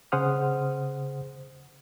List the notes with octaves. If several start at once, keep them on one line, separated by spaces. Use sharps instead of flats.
C#3 G#4 C5 F#5 D#6 F6